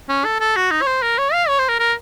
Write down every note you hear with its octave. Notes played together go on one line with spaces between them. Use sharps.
C#4
A4
A4
F#4
D#4
C#5
C5
A#4
C#5
F5
C#5
C5
A#4
A#4